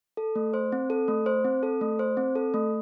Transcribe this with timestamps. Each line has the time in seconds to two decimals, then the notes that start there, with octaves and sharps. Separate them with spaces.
0.17 A4
0.36 A3
0.54 C5
0.72 C4
0.90 A4
1.08 A3
1.26 C5
1.45 C4
1.63 A4
1.81 A3
1.99 C5
2.17 C4
2.36 A4
2.54 A3